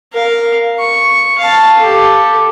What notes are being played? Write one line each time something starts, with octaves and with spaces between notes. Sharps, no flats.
A#4 F5
C#6
F5 A5
G4 A4